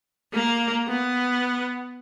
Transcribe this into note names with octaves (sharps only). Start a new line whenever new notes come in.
A#3
B3